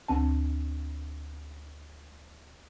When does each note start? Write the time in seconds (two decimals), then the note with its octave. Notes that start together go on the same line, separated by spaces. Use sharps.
0.08 D2 C4 A5